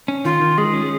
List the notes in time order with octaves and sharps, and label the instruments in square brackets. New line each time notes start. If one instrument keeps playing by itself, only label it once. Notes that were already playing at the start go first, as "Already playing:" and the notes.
[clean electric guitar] C#4
[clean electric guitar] D#3 [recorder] F4
[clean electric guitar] D#3
[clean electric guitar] G#3 [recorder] G#4
[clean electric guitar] C#4